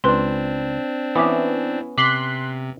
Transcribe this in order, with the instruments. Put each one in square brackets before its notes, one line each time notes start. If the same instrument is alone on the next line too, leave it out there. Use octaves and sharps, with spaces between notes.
[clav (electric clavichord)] C#2 [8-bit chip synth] C4 D4 [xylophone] B4 C6
[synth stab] E3 [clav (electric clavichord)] B3 C#4 [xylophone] E5 D6 D#6
[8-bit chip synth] C3 [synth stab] C6 F#6 B6 [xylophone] D6 G7